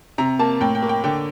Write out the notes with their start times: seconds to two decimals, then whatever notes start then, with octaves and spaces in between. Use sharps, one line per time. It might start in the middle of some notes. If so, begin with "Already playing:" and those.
0.18 C3 A#5
0.39 A#3 A5
0.60 A2 G5
0.75 G5
0.82 A#3
0.89 G5
1.04 D3 G5